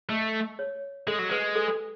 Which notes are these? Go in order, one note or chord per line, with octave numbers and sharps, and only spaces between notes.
A3 D#5
C#5
G#3 A4
F#3
G#3 B4
A4
A4